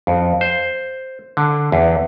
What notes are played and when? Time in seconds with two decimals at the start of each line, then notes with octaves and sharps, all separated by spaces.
0.07 F2
0.41 C5
1.37 D3
1.72 E2